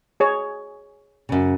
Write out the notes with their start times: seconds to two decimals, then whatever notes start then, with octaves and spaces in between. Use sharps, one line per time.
0.20 G#4 C#5
1.29 F#2 C#3